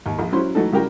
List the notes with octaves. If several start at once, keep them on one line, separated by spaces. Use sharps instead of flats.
D#2
A#1
F#3 C#4 E4 C5 C6
E3 F#3 A3 D#4 A4
C#3 F#3 G3 E4 A#4 G5